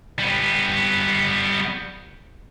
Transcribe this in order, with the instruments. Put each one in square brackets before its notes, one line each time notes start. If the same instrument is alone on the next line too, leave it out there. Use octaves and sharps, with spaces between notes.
[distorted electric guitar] G3 B3